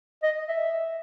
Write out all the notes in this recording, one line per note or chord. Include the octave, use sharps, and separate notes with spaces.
D#5
E5